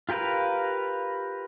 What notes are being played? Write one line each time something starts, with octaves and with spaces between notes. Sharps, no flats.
F4 G4 A#4 B4 F5